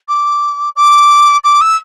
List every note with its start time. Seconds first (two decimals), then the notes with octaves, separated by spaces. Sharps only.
0.08 D6
0.76 D6
1.44 D6
1.61 E6